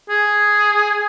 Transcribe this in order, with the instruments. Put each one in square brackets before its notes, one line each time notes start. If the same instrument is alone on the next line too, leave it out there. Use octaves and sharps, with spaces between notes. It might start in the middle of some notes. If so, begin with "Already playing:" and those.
[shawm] G#4